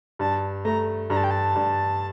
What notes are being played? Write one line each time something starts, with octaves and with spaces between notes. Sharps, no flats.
G2 A5
A3 A#5
G2 A#5
A5
G5
A5
G2